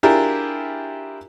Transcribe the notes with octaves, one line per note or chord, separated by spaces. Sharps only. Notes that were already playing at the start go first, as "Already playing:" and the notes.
D4 E4 F4 G4 G#4 A#4